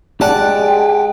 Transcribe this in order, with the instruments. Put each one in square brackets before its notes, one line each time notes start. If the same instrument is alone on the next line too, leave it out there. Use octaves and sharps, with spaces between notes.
[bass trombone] G#3 [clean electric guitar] G4 D#5 A5 [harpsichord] D5 F#5 [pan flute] G5